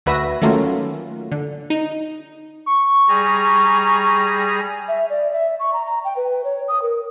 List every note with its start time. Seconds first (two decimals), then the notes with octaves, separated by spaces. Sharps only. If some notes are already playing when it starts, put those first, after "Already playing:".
0.06 D2 F#4 B4 E5 A#6
0.42 D#3 F#3 A3 A#3 C#4 F4
1.32 D3
1.70 D#4
2.66 C#6
3.08 G3 G#4 A#5
4.88 E5
5.10 D5
5.33 E5
5.60 C#6
5.73 A#5
5.86 A#5
6.04 G5
6.17 B4
6.44 C#5
6.68 D#6
6.82 A#4